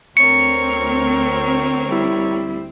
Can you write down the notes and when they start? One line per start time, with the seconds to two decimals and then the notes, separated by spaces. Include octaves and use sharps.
0.17 D2 C4 A#4 C#5 C#7
1.89 G3 E4